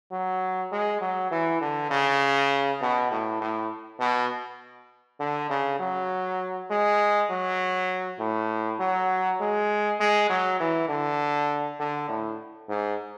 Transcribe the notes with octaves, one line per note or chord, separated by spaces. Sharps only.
F#3
G#3
F#3
E3
D3
C#3
B2
A2
A2
B2
D3
C#3
F#3
G#3
F#3
A2
F#3
G#3
G#3
F#3
E3
D3
D3
A2
G#2